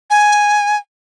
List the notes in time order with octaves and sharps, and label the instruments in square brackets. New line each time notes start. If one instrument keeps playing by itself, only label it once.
[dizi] G#5